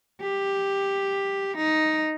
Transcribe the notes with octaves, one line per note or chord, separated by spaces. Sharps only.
G4
D#4